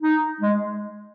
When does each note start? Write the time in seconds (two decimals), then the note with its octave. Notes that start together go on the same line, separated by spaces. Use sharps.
0.02 D#4
0.41 G#3